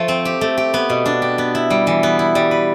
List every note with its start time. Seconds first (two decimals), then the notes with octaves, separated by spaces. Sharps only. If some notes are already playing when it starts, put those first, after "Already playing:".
Already playing: F3 A3
0.08 C4
0.25 G4
0.41 A3
0.57 G4
0.74 B3
0.90 B2
1.06 D4
1.22 G4
1.38 B3
1.55 E4
1.70 G3
1.87 E3
2.03 B3
2.19 E4
2.35 G3
2.51 B4